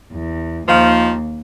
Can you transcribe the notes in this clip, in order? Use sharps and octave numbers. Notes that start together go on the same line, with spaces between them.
E2
D#2 D#3 F3